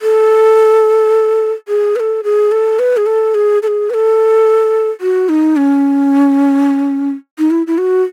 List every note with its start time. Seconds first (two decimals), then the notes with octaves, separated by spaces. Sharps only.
0.02 A4
1.68 G#4
1.96 B4
2.00 A4
2.24 G#4
2.52 A4
2.79 B4
2.97 G#4
3.06 A4
3.35 G#4
3.63 A4
3.68 G#4
3.90 B4
3.94 A4
5.01 F#4
5.29 D#4
5.57 C#4
7.39 D#4
7.51 E4
7.67 E4
7.78 F#4